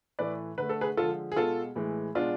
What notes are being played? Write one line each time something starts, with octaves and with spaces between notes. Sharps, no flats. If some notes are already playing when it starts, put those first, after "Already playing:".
A2 E3 A3 B4 D5
D3 A3 B4
A4
G#4 B4
D3 F3 G#3 F4 A4
G#4
B2 G#3 F4 A4
A2 E3 G#3
B2 G#3 D4 F4